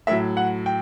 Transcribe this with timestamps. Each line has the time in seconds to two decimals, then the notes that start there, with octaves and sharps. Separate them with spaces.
0.07 A2 F#3 E5
0.37 F#5
0.66 G5